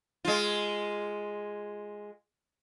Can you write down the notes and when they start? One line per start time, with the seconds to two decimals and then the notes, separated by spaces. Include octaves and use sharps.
0.25 G#3 F4